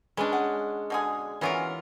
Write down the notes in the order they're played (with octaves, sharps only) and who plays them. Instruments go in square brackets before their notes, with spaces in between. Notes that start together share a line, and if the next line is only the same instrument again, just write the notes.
[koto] G#3 C#4 D4 [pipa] B4
[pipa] F#5
B2 D3 G#4
[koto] E3 F4 A#4 [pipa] F#3 B3 C#4